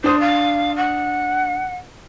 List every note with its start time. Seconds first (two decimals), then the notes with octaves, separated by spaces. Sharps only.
0.04 D4 C5 D#6
0.20 F5
0.76 F#5